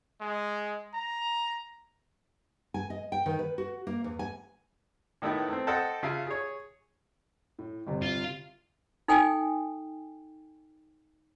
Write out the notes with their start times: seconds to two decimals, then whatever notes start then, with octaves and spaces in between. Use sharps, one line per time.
0.21 G#3
0.94 A#5
2.74 G#5
2.90 D#5
3.12 G5
3.26 D#3
3.39 B4
3.58 F#4
3.87 A#3
4.04 E2
4.19 G#5
5.22 A2 D#3 A3 B3 E4
5.48 A3 C4
5.67 A4 C5 D#5 F#5 G5 A5
6.03 C#3 F4 E5 F5 A5
6.27 G#4 C#5
7.59 A2
7.86 G1 C3
8.02 F4
9.08 D#4 A4 G5 G#5